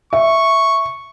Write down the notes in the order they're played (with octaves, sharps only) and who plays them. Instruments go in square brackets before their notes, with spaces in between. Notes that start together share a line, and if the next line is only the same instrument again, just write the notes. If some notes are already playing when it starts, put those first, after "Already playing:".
[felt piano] E5 [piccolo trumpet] C#6